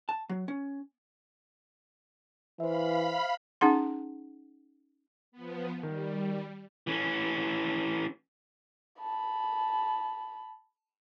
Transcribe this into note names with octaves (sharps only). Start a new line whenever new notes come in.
A5
F#3
C#4
E3 C5 E5 F5 B5
C#4 D#4 G#4 F#5 C6
F3 B3
D#3 G3
E3 C#4
A5 B5